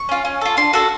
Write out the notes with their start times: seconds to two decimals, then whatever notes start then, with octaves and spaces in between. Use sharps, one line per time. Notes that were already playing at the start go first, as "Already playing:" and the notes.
Already playing: C#6
0.09 C#4 F4
0.25 C#4
0.41 F4 A4
0.57 D4 C6
0.73 F#4 A4 F#5